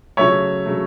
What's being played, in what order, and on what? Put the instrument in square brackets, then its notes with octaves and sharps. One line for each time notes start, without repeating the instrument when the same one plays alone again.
[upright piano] C#3 F#3 A3 [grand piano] C#5 E5
[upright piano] C#3 F#3 A3